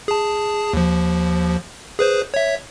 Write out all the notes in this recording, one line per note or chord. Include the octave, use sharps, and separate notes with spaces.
G#4 A5
D#2 F3
G#4 B4 C5
C#5 E5